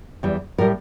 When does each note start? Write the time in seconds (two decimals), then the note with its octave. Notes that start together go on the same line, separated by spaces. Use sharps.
0.23 E2 E3 G3
0.58 A2 A#4
0.61 G3